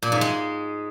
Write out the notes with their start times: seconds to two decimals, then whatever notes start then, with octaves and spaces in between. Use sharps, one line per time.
0.02 A#2
0.12 G#2
0.21 G#3